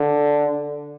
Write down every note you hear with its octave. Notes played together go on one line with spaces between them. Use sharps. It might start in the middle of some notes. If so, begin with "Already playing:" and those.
Already playing: D3